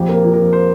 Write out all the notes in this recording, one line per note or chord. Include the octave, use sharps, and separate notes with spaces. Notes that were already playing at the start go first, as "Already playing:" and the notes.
Already playing: A#1 F2 G4
A#3
A#4
F3
A#4
F2
C5